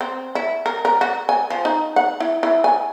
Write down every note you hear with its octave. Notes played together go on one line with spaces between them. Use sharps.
C4
E4
A#4
A#4
F#4
G#5
F3
D#4
F#5
E4
E4
G#5